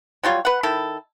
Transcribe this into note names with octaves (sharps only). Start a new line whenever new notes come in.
F#3 G3 F4 C#5
B4 F#5
D#3 E4 A4